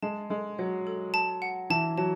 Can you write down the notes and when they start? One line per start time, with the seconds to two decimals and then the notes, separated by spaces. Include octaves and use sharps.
0.02 G#3 A5
0.30 G#3 A4
0.58 F#3 F#5
0.87 A4
1.14 A5
1.42 F#5
1.70 E3 A5
1.98 F#3 A5